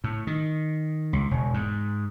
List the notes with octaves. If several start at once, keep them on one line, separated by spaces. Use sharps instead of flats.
A2
D#3
C#2
E1
G#2